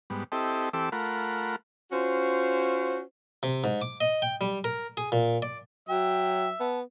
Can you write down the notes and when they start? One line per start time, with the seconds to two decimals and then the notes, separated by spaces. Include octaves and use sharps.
0.10 G#2 G3 B3
0.32 C4 E4 G4 A4 D#5
0.73 E3 C4 G4 A4 D6 E6
0.92 A3 F4 A#4 F#5 B5
1.92 C#4 F4 F#4 C5
3.43 C3
3.64 G#2
3.82 D6
4.01 D#5
4.22 G5
4.41 G3
4.64 A#4
4.97 G#4
5.12 A#2
5.42 D5
5.89 F#3 E5 G5
6.60 B3 A5